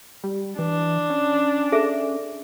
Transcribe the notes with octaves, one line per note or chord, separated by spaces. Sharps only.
G3
E3 D4
C#4
G#4 A4 E5